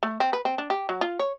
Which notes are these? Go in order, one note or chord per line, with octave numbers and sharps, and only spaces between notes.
A3
C4
B4
C4
D4
G4
F#3
F4
C#5